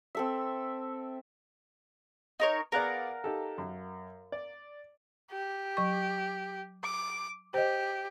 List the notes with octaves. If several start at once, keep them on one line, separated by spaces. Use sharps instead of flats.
C4 A4 E5
D#4 A#4 C#5
B3 G#4 A#4 D5 F5 F#5
D#4 G4 A4
F#2
D5
G4
F#3 C#6
D6
G4 C5 D#5